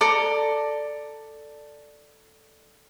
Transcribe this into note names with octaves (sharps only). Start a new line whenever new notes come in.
A4 D5 A#5